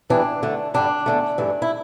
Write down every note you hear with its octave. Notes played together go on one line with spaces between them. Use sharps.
E2 E3 G3 D4
D2 D3 A3
G2 D3 G3 D4
E2 D3 A3
G2 E3 A3
E4